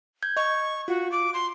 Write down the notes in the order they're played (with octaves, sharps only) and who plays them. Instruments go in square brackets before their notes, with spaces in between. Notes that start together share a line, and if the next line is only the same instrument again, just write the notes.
[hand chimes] G6 G#6
[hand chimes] D#5 [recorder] C#6
[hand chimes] F4 [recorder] F#4
[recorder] D6
C6